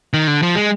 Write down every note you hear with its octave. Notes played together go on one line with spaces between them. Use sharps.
D#3
D3
F3
G#3